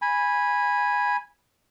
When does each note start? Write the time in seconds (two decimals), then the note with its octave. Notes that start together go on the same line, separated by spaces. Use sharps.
0.02 G#5 B5